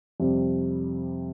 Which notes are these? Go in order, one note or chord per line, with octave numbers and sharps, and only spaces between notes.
F2 C3 G3